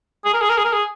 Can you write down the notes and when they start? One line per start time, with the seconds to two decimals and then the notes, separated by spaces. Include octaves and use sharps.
0.25 G#4
0.34 A#4
0.41 G#4
0.49 A#4
0.57 G#4
0.64 A#4
0.72 G#4